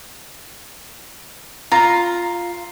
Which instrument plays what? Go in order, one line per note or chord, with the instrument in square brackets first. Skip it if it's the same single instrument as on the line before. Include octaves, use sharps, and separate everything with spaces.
[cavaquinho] F4 A#5